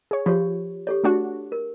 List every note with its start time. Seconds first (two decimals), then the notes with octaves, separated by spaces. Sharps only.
0.11 G#4 C#5
0.26 F3 F4 G4 C#5
0.87 G4 A4 C#5
1.04 A3 D4 F#4
1.52 A#4